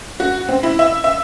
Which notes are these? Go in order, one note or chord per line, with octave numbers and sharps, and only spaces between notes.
F#4
C4
E4
E5
E5